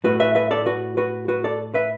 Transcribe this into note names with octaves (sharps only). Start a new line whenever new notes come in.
A2 A3 F#4 B4
B4 E5
B4 E5
A4 D5
F#4 B4
F#4 B4
F#4 B4
A4 D5
B4 E5